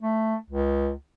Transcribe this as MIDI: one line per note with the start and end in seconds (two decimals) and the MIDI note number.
0.02 0.35 57
0.50 0.91 37